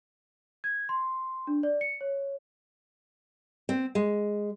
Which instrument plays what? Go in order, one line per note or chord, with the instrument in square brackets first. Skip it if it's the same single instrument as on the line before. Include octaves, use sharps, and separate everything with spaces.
[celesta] G#6
C6
D4
D5
C#7
C#5
[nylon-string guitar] C4
G#3